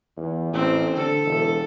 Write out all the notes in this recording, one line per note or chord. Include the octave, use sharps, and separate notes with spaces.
E2
A1 C4
D3 A4
E1